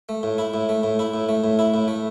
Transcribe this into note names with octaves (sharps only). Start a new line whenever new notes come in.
A3
A2
E4
A2
A3
A2
E4
A2
A3
A2
E4
A2
A3